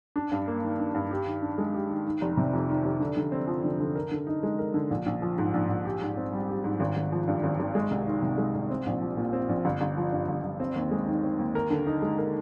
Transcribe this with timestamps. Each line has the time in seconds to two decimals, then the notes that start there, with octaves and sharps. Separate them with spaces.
0.16 D4
0.32 G2
0.48 A#3
0.63 D#3
0.79 D4
0.95 G2
1.11 G4
1.26 D#3
1.42 D4
1.58 G#3
1.74 G4
1.89 D#3
2.06 D#3
2.21 F1
2.37 C3
2.53 F2
2.69 D#3
2.85 F1
3.00 D3
3.17 D3
3.32 C4
3.47 F3
3.63 D3
3.80 D3
3.96 A#4
4.12 D3
4.27 D#4
4.43 G#3
4.59 A#4
4.74 D3
4.91 A#1
5.06 A#1
5.22 F3
5.38 G#2
5.54 A#1
5.69 A#1
5.85 G4
6.01 G#2
6.17 C4
6.32 G3
6.49 G4
6.64 G#2
6.80 G#1
6.96 G#1
7.12 F3
7.28 G2
7.43 G#1
7.59 G#1
7.75 G#3
7.91 C2
8.06 D#3
8.22 C3
8.38 G#3
8.55 C2
8.71 C4
8.86 A#1
9.02 F3
9.17 A#2
9.33 C4
9.49 A#1
9.65 G1
9.81 G1
9.97 F3
10.12 G2
10.29 G1
10.44 G1
10.60 C4
10.76 D#2
10.91 G#3
11.07 D#3
11.23 C4
11.39 D#2
11.55 A#4
11.70 D3
11.87 D#4
12.02 G#3
12.18 A#4